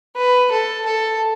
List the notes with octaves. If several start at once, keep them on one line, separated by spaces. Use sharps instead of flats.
B4
A4
A4